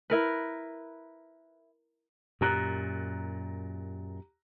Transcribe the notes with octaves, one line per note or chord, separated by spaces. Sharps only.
E4 A#4 B4
F#2 A#2 G4 A#5 F#6